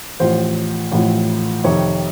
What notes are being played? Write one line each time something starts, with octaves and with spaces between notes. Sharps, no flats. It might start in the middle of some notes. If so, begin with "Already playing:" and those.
A1 A2 F3 C5
A1 A2 F3
F2 C3 D#3 C#5